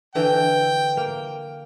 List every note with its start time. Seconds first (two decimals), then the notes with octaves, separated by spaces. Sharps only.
0.15 D3 E3 G5
0.97 A#3